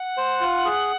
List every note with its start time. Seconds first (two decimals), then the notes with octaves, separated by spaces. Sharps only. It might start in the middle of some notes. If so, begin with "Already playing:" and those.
Already playing: F#5
0.17 C5
0.41 F4
0.65 G#4